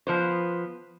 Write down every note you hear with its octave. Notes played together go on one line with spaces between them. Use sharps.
F3 B3 C5